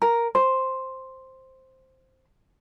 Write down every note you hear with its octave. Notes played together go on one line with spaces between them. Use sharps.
A#4
C5